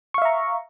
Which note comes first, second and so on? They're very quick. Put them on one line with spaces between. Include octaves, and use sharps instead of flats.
C#6 F5 E5 A#5